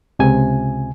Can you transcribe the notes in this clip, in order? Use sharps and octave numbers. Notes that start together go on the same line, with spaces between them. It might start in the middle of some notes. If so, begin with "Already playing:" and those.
C#2 C3 G#5